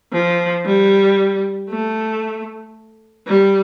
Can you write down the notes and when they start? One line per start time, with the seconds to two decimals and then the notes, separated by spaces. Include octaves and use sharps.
0.13 F3
0.65 G3
1.70 A3
3.27 G3